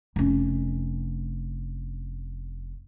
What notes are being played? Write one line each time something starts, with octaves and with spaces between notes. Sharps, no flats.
F1 C#4